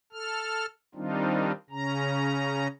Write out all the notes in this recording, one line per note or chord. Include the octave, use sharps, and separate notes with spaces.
A4 F6
D#3 G3 C4 D4 D#4 F4
C#3 C#4 A#5